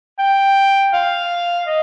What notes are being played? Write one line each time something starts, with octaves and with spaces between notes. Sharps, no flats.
G5
F5
D#5